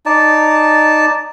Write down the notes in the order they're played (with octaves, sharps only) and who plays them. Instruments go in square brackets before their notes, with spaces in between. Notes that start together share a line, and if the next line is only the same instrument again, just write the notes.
[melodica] D#4 D5 A5